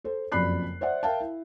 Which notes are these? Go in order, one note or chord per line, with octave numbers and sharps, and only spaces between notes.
A4 C5
F#1 F2 D5 B5 F#6 C7
C5 D5 E5 F#5
A#4 E5 F5 G5 A5
E4